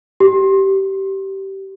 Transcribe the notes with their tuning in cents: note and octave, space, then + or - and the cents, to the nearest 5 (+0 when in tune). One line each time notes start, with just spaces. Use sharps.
G4 -20